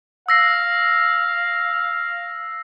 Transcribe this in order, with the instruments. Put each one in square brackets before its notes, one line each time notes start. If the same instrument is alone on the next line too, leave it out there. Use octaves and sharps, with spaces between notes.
[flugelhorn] F5 [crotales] E6 A#6 C7